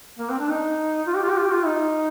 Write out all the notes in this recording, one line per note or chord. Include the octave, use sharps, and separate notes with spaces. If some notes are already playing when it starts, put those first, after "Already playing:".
A#3
C4
D4
D#4
F4
G4
F4
G4
F4
G4
F4
D#4